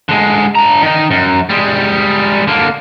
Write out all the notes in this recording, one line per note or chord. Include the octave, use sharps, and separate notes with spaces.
D3 G#3
D4 A#5
D#3 D#4
F#2
G3 G#3
D3 A#3